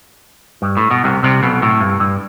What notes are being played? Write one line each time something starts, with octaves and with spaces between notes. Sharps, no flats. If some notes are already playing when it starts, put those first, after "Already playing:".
G2
A2
B2
C2 C3
C2 C3
B1 B2
A2
G2
G2